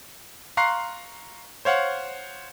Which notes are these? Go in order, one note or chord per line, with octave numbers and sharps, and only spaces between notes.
F5 A#5 C6 C#6 F#6 C7
C5 C#5 F5 F#5